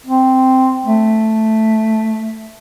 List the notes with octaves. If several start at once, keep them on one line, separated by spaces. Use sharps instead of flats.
C4
A3